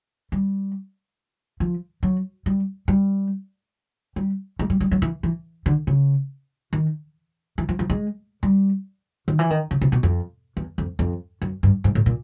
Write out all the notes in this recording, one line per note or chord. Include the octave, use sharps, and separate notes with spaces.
G3
F3
F#3
G3
G3
G3
G#3
G3
G3
F#3
E3
E3
D3
C#3
D#3
E3
F3
F3
G#3
G3
D#3
E3
D#3
C#3
C3
B2
F2
E2
F2
F2
F#2
G2
G#2
A2
A#2